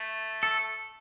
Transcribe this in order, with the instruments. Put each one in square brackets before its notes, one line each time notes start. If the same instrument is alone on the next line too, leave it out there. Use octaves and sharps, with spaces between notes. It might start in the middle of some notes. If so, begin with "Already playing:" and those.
Already playing: [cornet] A3
[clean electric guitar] A4